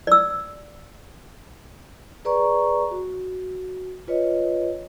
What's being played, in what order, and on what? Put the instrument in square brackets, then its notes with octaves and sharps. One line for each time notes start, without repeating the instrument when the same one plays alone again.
[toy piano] D5 E6
[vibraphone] G#4 B4 D5 A#5 C#6
F#4
F4 B4 C#5 D#5